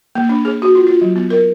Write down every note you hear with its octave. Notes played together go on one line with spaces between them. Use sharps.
A#3
D4
G#4
F#4
F4
F4
F#3
B3
A#4